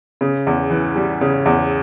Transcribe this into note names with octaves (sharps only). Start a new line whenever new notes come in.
C#3
E2
E3
G3
C#3
E2